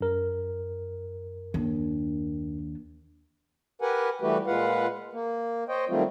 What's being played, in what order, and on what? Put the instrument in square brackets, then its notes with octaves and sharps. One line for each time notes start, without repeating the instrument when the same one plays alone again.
[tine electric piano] F#2 A#4
[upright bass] D#2 D4
[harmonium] G4 A#4 B4 F#5 G#5
E3 G3 A3 F#4 G4 B4
A#2 G#3 F4 B4 F5 F#5
A#3
C5 C#5 D#5 G5
D#3 F#3 G3 A3 C4 F4